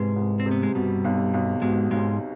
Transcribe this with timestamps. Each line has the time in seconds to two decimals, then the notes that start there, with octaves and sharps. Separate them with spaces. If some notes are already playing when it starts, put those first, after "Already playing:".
Already playing: C2 G#2 C3 G#3 B3
0.16 C2
0.40 C4
0.46 C3
0.51 B3
0.63 G#3
0.75 G2 B2 G3
1.04 B1
1.34 B1
1.62 G#2 B2 G#3
1.91 B1 G#2 G#3